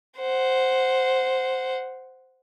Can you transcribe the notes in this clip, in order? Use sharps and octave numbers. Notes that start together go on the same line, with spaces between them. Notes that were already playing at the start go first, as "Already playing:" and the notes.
C5 F#5